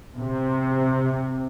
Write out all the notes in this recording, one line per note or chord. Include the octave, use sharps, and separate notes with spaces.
C3